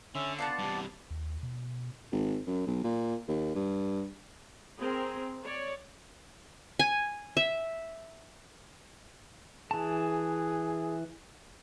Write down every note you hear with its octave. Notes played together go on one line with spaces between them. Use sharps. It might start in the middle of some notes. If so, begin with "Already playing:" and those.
D3 C#4 E5
B3 D4 F4 F#5 A5
G2 C3
D#2
B2
G#1
F#2
B1
A#2
D#2
G2
C4 G#4 A#4
C#5 D5
G#5
E5
E3 G#4 A5